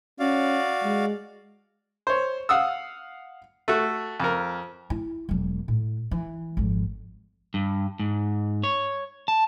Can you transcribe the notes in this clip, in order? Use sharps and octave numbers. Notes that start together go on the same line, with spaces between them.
C#4 F#4 D5 F5
G#3
C5 C#5
F5 F#5 D#6 E6
A3 F#4
F2 A#4
E4
E1 F#3
A2
E3
G#1 F2
G2
G#2
C#5
A5